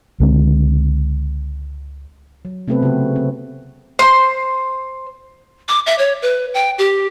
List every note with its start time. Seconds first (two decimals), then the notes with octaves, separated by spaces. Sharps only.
0.20 C#2 D3 G#3 C4
2.45 F#3
2.68 C3 A3 B3 C4 A4 B4
2.82 C#3 F#4
3.16 C4
3.99 C5 C6
5.68 D6
5.86 E5
5.98 C#5
6.22 B4
6.54 G5
6.78 G4